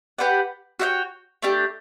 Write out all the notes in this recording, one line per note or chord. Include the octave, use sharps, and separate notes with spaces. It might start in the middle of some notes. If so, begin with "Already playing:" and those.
G4 B4 D5 F#5
F#4 C#5 E5 G5
A3 D4 G4